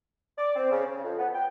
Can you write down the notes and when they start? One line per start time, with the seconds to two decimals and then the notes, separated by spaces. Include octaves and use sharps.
0.38 D5
0.56 C4
0.71 C#3
0.85 C#3
1.04 F2
1.18 B3
1.34 G5